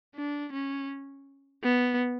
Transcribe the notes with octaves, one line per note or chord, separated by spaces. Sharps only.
D4
C#4
B3